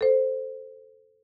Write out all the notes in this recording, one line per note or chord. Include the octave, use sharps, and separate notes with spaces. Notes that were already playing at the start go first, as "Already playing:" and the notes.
A4 C5